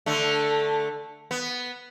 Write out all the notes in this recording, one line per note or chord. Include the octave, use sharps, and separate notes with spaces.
D3 A3
B3